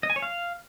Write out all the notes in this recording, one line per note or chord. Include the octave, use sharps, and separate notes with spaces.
D#5
G#5
C#5
F5